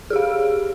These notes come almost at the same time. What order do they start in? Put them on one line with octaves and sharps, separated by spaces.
G#4 G4 F5